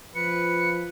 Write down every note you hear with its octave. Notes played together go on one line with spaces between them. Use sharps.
F3 B4 C#7